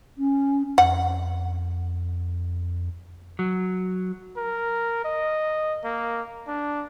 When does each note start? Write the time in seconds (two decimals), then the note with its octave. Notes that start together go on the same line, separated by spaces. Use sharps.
0.18 C#4
0.78 F2 F#5
3.39 F#3
4.37 A#4
5.05 D#5
5.84 A#3
6.48 D4